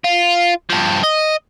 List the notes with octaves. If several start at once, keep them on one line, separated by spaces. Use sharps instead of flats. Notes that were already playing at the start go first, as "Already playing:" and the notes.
F4
G2 F3
D#5